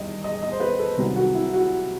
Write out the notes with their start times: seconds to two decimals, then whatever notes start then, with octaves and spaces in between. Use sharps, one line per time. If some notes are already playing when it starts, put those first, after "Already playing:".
Already playing: E2 D#3 G3 D#5
0.24 D#5
0.42 D#5
0.52 C5
0.60 B4
0.79 A4
0.97 C2 C3 D#3 F#3
1.16 F#4
1.35 E4
1.53 F#4